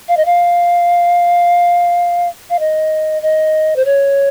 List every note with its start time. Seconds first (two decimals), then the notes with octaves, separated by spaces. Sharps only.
0.08 F5
0.17 D#5
0.25 F5
2.50 F5
2.59 D#5
3.22 D#5
3.76 C5
3.85 C#5